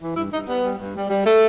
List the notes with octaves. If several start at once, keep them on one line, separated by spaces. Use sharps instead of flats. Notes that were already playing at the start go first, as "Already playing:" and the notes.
E3
G2 E4
G2 D#4
G3 B3
G3
G2
G3
G3
A3 A4